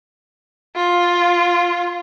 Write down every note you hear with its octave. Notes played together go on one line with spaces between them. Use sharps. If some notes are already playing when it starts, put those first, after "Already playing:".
F4